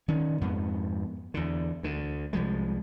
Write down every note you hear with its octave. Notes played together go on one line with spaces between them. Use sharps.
D#3 C#4
F2 G#2 B3
E2 D3
D2 D3
C2 F3 G#3